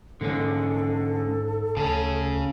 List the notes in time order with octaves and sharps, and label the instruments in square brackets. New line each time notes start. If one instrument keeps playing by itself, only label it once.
[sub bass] G#2 [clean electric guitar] D3 G#3 C#4 [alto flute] A4
[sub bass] D2 [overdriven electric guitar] C#3 C#4 [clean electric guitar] A5